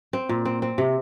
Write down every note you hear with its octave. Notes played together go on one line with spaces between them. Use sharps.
C4
A#2
C4
C4
C3